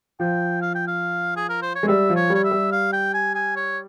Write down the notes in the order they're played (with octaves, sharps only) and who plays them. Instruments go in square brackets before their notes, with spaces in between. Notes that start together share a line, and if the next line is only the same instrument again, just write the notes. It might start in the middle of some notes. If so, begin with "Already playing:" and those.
[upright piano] F3 [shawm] G5
[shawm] F5
G5
F5
G#4
A#4
C5
C#5
[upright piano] G#3
[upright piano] G3 [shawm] E5
[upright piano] F3
[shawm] C#5
[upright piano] G3 [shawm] C#5
[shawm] E5
[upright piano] G3
[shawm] F5
G5
G#5
G#5
C#5